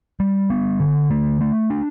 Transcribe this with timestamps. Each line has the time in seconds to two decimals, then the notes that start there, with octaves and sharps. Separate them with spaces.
0.20 G3
0.50 B3
0.80 D3
1.10 A3
1.41 A3
1.70 D4